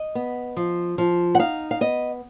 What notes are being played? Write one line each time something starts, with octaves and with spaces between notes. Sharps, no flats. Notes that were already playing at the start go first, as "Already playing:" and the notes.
Already playing: D#5
B3
F3
F3
F#5
D#4 F5
F5
B3 D#5